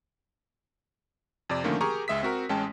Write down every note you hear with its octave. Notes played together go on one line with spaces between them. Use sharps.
F2 C3 D5
D3 D#3 F3 A3 A#3 C#4
G4 G#4 A#4 A#5 C#6
C#2 G#3 E5 D#6 B6
C4 F#4 A#4
A1 G#3 C#4 G5 A5